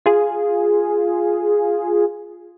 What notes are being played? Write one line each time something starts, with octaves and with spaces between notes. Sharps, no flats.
F4 G#4